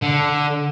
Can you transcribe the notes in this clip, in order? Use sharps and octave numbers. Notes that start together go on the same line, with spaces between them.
D3